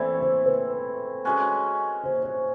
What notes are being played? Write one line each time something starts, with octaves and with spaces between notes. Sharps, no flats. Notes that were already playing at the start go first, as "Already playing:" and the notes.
Already playing: E3 A3 C4 E4 C5 D5
C5
B4
G#3 C#4 F#4
C5
C5